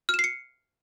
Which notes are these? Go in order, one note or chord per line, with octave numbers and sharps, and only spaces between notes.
F6
E7
C7
C#7